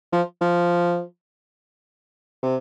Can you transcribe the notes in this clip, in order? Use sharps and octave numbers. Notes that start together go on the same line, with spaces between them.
F3
F3
C3